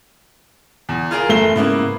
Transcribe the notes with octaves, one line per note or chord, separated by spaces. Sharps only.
E2
F4 G#4 A#4
F#1 A3 C7 G7
G#2 C#3 A#3 B3 E4